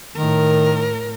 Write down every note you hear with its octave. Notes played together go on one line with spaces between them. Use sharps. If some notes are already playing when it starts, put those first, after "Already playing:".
A2 D#3 A#4